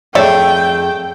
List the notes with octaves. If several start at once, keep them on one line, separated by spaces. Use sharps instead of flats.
F2 A3 G#4 C#5 D5 E5 G5